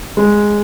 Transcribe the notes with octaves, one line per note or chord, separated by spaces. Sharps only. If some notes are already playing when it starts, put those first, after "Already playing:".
G#3